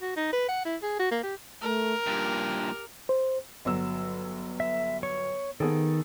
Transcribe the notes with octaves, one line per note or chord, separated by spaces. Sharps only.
F#4
D#4
B4
F#5
E4
G#4
F#4
A#3
G4
A3 A#4
G2 A#2 G4
C5
G1 F#3 E6
E5
C#5 C#6
D#3 B3 G#4 A4